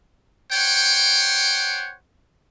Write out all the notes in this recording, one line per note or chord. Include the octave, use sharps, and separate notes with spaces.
C5 C#5 F#5 G5